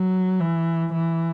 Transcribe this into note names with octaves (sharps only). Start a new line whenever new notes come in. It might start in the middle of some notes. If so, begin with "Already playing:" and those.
Already playing: F#3
E3
E3